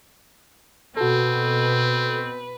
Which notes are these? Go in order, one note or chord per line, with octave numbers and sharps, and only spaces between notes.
B2 C4 F#4 A4 B4